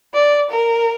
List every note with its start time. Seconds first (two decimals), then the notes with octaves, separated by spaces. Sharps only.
0.14 D5
0.50 A#4